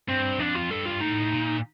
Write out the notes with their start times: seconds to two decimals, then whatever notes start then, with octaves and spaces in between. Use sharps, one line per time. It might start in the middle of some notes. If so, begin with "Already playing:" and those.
0.08 G2 C4
0.39 F2 D4
0.55 F4
0.70 G2 A4
0.86 F4
1.00 A2 D#4
1.31 A#2